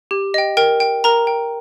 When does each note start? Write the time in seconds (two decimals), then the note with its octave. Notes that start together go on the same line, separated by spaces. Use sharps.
0.11 G4
0.34 D#5 G5
0.57 A#4 G5
0.80 G5
1.04 A#4 A#5
1.27 G5